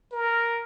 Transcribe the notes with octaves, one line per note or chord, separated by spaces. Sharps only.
A#4